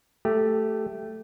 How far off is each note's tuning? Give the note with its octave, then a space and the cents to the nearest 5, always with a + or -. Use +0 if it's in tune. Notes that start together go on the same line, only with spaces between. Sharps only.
A3 +0 G4 +0